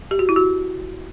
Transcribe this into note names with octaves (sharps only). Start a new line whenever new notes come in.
G4
F#4
E4
F#4